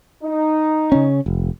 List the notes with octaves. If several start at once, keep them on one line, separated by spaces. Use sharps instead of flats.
D#4
C#3 C#4
F1